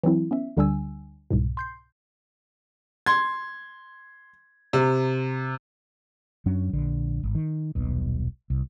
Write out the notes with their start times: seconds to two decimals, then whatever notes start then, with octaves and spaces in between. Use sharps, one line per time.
0.03 E3 F#3 C4 E4
0.31 B3 C#4 E5
0.57 D2 D3 G3 D4 G#5 E6
1.31 C2 G#2 B2
1.57 C6 G6 C7
3.06 C6 G#6
4.73 C3
6.46 F#2 F#3 C#4 D4
6.73 A#1 D3
7.23 G#1
7.35 D#3
7.75 D#1 B1 B2
8.50 C2